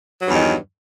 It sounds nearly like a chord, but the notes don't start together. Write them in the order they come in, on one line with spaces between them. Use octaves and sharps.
F#3 G2 E2 D#3